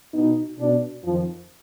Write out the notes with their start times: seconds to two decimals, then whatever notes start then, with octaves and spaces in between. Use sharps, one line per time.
0.14 B2 D#4
0.59 B2 D4
1.04 F2 D#3 F3